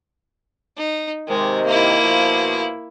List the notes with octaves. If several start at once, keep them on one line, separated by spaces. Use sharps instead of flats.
D#4
C3 D#3 G#3
A#3 E4
B2 F3